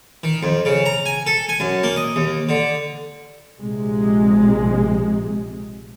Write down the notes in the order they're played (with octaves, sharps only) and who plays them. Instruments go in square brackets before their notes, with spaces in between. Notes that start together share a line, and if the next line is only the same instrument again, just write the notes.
[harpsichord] D#3
F2
C#3
A#5
G#5
A4
G#5
F#2
A#3
D#5
D#2
D3
[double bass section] A#1 C3 G#3